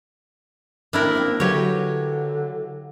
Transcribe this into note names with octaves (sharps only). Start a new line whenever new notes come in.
D#3 A#3 C4 D4 E4 A#4
A#3 C4
D3 F#3 E4 G4 B4 C#5